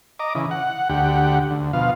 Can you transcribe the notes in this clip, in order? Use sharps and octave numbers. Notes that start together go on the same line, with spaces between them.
D#5 A#5 D6
C#3 E3
F#5
D2 G4 F#5
D2
B2 F3 F5